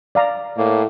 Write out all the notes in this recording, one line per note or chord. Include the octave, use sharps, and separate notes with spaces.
D5 F5 A#5
A2 A#3